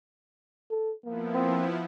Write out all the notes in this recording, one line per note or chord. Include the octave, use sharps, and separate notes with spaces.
A4
F3 A#3 B3 E4
C4